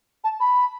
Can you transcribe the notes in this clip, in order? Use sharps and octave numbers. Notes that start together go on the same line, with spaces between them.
A5
B5